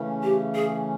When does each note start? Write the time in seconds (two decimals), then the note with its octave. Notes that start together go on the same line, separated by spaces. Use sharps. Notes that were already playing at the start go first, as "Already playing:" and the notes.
Already playing: C#3 E3 A3 C#4
0.23 G4
0.55 G#4